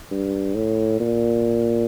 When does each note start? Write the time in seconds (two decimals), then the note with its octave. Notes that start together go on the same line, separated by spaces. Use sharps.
0.11 G2
0.55 A2
1.00 A#2